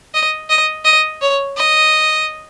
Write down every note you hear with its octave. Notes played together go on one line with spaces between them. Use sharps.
D#5
D#5
D#5
C#5
D#5